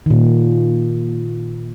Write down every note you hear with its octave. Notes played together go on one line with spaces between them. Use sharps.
A#2 D#3